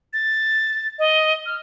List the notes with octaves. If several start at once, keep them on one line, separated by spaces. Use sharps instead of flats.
A6
D#5
F6